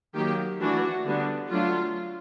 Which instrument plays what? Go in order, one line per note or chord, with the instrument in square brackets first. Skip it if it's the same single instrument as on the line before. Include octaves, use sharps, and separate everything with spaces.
[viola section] D#3 F#3 A#3 G4
E3 A3 D4 F#4
D3 G3 B3 D4
F#3 A3 D4 F4